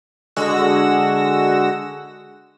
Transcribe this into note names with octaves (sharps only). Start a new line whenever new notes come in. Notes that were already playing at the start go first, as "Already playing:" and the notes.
D3 G#3 F#4 E6 A#6